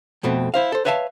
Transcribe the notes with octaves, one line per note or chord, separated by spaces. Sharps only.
F2 B2 A3 C4
E4 C5 F5
A4 C5
B4 C#5 E5 F5 G#5 A5